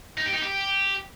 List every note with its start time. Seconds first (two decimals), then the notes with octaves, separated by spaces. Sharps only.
0.18 D#4
0.26 G4
0.34 D#4
0.42 G4